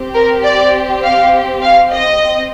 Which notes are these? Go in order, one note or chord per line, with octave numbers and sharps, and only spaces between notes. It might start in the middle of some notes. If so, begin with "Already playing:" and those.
Already playing: C4 G4
A#4
D5
F5
F5
D#5
C4